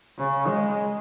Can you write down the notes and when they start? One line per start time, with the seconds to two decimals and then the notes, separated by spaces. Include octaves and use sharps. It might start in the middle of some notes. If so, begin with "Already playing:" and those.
0.18 C#3
0.47 G#3